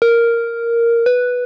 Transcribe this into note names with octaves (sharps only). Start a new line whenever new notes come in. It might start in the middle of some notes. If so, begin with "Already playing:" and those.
A#4
B4